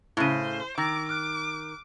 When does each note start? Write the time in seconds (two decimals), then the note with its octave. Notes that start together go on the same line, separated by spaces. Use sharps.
0.17 A2 C#3 E4 C5 D#7
0.78 D#3 D6 E6 A#6
1.09 D6 F6 F#6